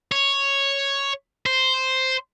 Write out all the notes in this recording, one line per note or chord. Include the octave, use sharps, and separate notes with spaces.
C#5
C5